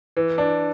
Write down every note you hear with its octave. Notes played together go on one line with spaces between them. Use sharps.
E3
D4